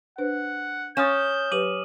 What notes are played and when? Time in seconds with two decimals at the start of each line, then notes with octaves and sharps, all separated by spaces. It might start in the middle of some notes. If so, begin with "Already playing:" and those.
0.18 D4 B4 C5 F#5
0.97 C#4 F5 C6 D#6 F6 G6 A6 E7
1.51 F#3 G4 B4 D6 D#7 F#7